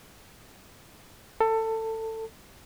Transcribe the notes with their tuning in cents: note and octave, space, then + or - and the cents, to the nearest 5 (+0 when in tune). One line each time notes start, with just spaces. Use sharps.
A4 +20